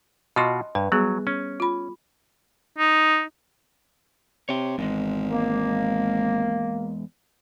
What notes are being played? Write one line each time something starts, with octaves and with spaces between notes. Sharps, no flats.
B2 F4 F#4 D#5 C6
G2 B4
F#3 G3 B3 G#4
C#4
F4 B5
D#4
C3 C#5 G5
G#1 E2 G#3
A#3